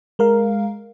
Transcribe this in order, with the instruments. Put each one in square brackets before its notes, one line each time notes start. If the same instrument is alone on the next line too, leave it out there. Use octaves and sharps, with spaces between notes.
[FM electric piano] G#3 A#4 F5